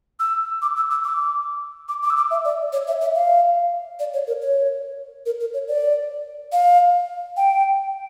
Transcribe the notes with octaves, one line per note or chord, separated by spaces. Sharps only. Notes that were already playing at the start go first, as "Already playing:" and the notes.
E6
D6
E6
E6
D6
D6
D6
E6
D6
E5
D5
C#5
E5
E5
F5
D5
C#5
A#4
C#5
A#4
A#4
C#5
D5
F5
G5